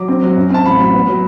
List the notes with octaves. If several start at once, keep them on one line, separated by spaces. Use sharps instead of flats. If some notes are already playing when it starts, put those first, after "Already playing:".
Already playing: F#3 D6
C4
F#3
F#2
C4 A5
A1 B5
F#3
B3
F#3